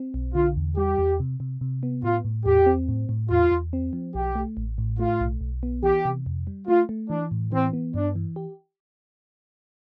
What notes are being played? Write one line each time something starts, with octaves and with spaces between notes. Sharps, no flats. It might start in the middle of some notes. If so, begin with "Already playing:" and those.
Already playing: C4
B1
D3 F4
E2
G3 G4
E2
C3
C3
C3
B3
A2 F4
A2
E2 G4
C4
A2
A2
E2 F4
E2
C4
F3
B1 G4
A3
A1
A2
A3 F4
B1
B1
B3
E3 G4
C3
F2
G3
A3 F4
A3
E3 D4
A2
E3 C4
B3
G2 D4
E3
G4